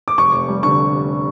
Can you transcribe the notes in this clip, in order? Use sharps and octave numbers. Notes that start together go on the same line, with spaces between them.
D6
F1 C#6
F1
G3
D3 C#6